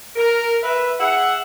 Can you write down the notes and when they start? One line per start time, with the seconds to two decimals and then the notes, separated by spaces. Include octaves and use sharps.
0.16 A#4
0.63 B4 E5
0.99 G#4 E5 F#5